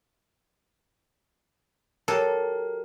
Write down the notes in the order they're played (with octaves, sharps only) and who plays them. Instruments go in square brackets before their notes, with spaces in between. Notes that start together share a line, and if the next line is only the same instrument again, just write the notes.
[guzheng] F#3 G4 [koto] A4 [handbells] A#4